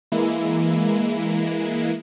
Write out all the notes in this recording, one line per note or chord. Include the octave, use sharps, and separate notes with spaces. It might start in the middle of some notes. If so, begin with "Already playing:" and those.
E3 G#3 A#3 E4